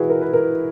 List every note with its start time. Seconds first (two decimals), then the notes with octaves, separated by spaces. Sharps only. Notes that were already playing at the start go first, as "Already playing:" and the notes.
Already playing: E3 E4 F#4 G#4 B4
0.10 A#4
0.21 B4
0.33 A#4